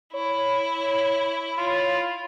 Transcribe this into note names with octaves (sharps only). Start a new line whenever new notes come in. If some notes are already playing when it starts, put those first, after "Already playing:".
E4 C#5
F4